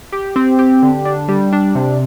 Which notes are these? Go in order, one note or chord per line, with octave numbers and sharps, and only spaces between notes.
G4
C4
G4
D3
D4
G3
D4
C3